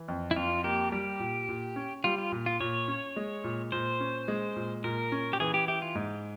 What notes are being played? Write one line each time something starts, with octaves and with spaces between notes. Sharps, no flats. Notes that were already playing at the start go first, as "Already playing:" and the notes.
Already playing: E3
F2
E4
F2 F4
A#3 G4
G3 G4
A#2
A#2
C#4
G3 F4
F4
A#2
F4
A#2 C#5
C#4
G#3
A#2
A#2 C5
C#4
G#3
A#2
A#2 A#4
C#4
G4
E3 G#4
G4
E4 G4
F4
G#2